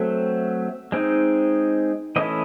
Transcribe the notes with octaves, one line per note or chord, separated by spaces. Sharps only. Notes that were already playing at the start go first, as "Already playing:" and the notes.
Already playing: F#3 A3 C4 E5
G#3 C4 D#4
E3 A3 C#4 E4 D#5